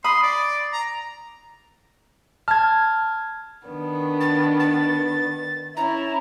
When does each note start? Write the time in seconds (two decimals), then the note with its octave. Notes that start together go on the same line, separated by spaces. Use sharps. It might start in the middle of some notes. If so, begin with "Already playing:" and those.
0.04 B5 C6 D#6
0.23 D5
0.73 A#5
2.48 A5 F6 G#6
3.67 D#3 B3 D4
4.20 A6
4.59 A6
5.76 C#4 E4 A#5